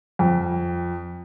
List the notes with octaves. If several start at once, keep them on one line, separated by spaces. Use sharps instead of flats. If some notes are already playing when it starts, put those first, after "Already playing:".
F2